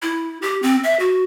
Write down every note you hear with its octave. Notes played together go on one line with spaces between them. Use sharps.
E4
G4
C4
E5
F#4